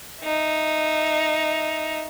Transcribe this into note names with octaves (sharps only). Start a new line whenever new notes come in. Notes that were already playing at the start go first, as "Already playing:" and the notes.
D#4 E5